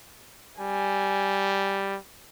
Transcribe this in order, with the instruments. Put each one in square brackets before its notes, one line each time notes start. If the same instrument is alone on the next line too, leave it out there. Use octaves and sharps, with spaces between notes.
[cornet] G3 [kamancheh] G#5